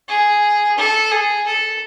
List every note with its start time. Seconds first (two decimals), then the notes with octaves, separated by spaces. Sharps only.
0.08 G#4
0.78 A4
1.11 G#4
1.47 A4